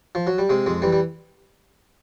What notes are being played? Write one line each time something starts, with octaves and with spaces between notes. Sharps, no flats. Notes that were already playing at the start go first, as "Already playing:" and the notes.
F3
F#3
G3
C3 G#3
F2 G#3
E3 G3
G3